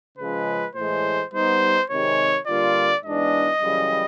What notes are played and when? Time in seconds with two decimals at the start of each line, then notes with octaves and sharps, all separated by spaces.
0.18 C#3 F3 G#3 B4
0.75 A2 E3 G#3 C5
1.33 G3 B3 D#4 C5
1.90 C3 D#3 G#3 C#5
2.47 D3 G3 A#3 D4 F4 D5
3.04 G#2 E3 G#3 B3 D4 D#5
3.61 F#2 C#3 E3 G3